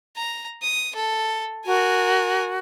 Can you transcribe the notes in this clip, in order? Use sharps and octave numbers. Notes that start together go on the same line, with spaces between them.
A#5
D#6
A4
F#4 A#4 G#5